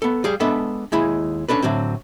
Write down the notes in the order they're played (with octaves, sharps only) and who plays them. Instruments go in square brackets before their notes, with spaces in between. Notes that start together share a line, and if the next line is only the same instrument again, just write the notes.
[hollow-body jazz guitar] B3 A4
G3 G#4 F5
G#3 B3 D4 A4 B4 E5
D#2 G#3 E4 G#4
C#4 D4 A4 B4
A2 D3 F#3 C4